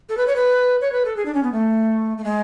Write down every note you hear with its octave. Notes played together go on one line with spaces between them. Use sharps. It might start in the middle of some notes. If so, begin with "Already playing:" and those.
A4
B4
C#5
B4
C#5
B4
A4
G#4
D4
C#4
B3
A3
A3
G#3